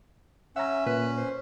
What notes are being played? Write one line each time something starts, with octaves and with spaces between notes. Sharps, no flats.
C#4 E5 F#5 A#5
A#2 B4
C5